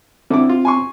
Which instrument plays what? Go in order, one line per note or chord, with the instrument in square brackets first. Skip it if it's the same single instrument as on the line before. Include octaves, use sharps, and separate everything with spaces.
[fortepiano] D3 E4 D6 [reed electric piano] C4
[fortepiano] F4
G#5 C6 C#6